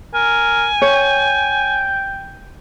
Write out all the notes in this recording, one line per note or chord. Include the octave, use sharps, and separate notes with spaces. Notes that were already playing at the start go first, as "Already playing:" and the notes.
A#4 G#5
C#5 G5